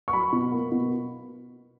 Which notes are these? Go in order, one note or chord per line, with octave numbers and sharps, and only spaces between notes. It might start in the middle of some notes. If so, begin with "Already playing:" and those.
C#6
F#3 B5
B2
A#3
B2